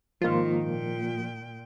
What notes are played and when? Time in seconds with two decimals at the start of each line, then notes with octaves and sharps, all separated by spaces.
0.22 G#2 D#3 F3 A#3 F4
0.63 A#2 G5